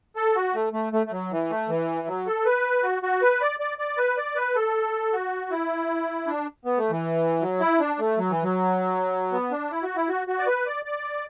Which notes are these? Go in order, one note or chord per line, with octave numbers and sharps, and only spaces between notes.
A4
F#4
A3
A3
A3
A3
F#3
E3
A3
E3
F#3
A4
B4
F#4
F#4
B4
D5
D5
D5
B4
D5
B4
A4
F#4
E4
D4
B3
A3
E3
F#3
E4
D4
A3
F#3
E3
F#3
B3
D4
E4
F#4
E4
F#4
F#4
D5
B4
D5
D5